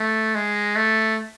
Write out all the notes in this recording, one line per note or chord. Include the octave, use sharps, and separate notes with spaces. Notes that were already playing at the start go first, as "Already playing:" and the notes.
Already playing: A3
G#3
A3